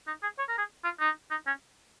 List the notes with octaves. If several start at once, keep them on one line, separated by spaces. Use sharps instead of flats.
D#4
G#4
C#5
A#4
G#4
F4
D#4
D#4
C#4